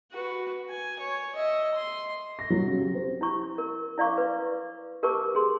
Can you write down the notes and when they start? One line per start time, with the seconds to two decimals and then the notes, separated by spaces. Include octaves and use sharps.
0.11 F#4 B4
0.70 G#5
0.99 C#5
1.35 D#5 E5
1.74 C6
2.39 A#6
2.50 F#3
2.67 C#3
2.79 G4
2.95 C4
3.21 E4 C#6
3.58 A#4
3.98 E4 D5 F5 C#6 D6
4.18 B4
5.03 G4 A#4 B4 A5 C#6 D6
5.35 G#4 B4 C6 D6